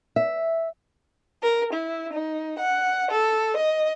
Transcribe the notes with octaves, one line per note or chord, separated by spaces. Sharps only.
E5
A#4
E4
D#4
F#5
A4
D#5